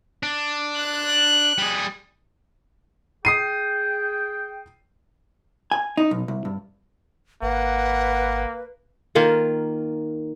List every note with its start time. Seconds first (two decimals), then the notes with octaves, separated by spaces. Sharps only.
0.23 D4
0.77 F#6
1.58 G3 G#4
3.25 G#4 G5 D#6 C7 D#7
5.72 G#5
5.97 D#4
6.11 B1
6.28 C2
6.45 G2
7.42 G#1 A#3 B4 F#5
9.15 D#3 A#3 F4